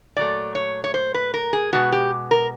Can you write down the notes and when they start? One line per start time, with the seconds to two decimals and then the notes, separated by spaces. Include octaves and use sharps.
0.17 A#2 F#3 A3 D5
0.55 C#5
0.84 C#5
0.94 C5
1.14 B4
1.34 A#4
1.53 G#4
1.73 B2 G#3 B3 F#4
1.92 G4
2.31 A#4